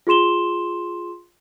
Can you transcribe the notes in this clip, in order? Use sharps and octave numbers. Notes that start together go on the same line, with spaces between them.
F4 G#4 C6 E7 G7